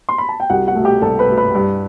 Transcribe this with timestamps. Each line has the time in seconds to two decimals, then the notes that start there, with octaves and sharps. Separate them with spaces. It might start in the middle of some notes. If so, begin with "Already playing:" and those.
0.09 C6
0.18 B5
0.29 A5
0.40 G5
0.49 C2 F#4 F#5
0.67 F#4 F#5
0.76 B2 A3
0.85 G4 G5
1.02 C2 A4 A5
1.19 B4 B5
1.28 B2 A3
1.37 B4 B5
1.55 G2